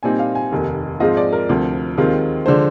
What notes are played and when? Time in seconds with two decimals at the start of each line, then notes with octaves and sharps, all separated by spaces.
0.03 A#2 G3 C4 D#4 G#5
0.19 F5
0.35 G#5
0.52 F1 D#2 D#3
1.00 G#2 F3 G#3 C4 F4 D#5
1.17 D5
1.33 A#4
1.49 D2 C3 F3
1.97 D#2 D#3 G#3 C4 F4
2.46 D3 F3 G#3 C5